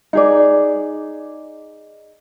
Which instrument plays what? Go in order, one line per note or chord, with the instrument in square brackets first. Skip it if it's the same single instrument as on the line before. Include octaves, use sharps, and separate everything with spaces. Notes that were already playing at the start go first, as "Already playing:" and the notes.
[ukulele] D#4 G#4 D5